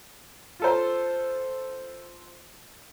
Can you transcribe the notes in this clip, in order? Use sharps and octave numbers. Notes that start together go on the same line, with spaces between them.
F4 A4 C5